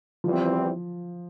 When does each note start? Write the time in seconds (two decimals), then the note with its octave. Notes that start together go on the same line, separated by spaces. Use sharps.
0.24 E2 E3 F3 G3 C4